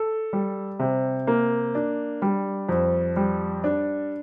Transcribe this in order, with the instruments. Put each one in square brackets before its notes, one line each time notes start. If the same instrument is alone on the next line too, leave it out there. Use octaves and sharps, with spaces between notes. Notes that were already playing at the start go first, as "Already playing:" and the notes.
Already playing: [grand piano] A4
G3
C3
A#3
D4
G3
F2
G3
D4